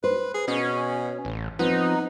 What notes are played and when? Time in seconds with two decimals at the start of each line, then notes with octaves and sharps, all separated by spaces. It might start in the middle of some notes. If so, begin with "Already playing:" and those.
0.04 B4 C5
0.34 G#4
0.48 B2 C#4
1.25 A1
1.59 F3 B3 C4 D#4